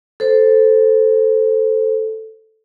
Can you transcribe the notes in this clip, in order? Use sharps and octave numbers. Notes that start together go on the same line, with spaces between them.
A4 C5